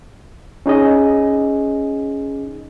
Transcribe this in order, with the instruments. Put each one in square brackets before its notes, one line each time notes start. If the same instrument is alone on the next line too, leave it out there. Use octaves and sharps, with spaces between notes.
[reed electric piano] C#4 D#4 G#4 D#5